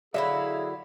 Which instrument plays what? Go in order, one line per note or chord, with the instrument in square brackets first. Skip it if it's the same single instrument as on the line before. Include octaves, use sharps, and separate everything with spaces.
[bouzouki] D3 F#3 E4 [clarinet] G#4 [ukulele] E5 [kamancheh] F5